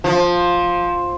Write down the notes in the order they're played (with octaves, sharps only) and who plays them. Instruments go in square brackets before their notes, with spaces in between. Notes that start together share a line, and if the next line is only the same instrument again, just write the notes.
[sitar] F3